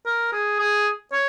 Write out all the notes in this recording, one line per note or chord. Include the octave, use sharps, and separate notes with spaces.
A#4
G#4
G#4
C#5